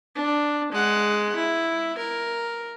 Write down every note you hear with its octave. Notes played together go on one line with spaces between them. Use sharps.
D4
G#3 F#5
E4
A#4